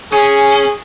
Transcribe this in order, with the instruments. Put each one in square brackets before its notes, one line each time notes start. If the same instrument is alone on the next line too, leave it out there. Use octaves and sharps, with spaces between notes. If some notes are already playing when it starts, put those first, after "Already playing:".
[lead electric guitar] C#4 [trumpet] G#4